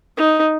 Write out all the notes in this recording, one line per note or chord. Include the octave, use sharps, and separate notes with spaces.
D#4